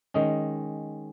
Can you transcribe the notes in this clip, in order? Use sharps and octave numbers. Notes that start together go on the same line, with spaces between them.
D#3 G#3 C#4 D#5